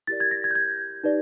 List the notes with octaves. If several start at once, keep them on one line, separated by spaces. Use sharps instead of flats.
E4 G4 A#4 D5 A6
G#6
A#6
G#6
G6
G#6
D#4 G4 B4 D5